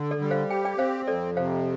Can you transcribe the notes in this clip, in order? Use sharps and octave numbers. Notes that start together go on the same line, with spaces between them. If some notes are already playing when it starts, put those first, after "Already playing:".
Already playing: D3
A4 D5
G3
C5 F5
G4 G5
D5 G5
C4 C5 F5
F2 A4 D5
C3 C5 F5